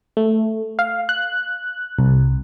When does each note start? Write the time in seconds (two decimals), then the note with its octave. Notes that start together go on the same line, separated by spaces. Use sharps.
0.17 A3
0.79 F5
1.09 F#6
1.99 C2